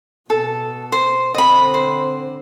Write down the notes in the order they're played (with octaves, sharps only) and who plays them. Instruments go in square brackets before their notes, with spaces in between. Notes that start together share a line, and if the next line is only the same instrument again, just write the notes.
[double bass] B2 [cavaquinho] A4
[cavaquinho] C5
[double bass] D3 C4 [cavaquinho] D#5 B5
[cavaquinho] C5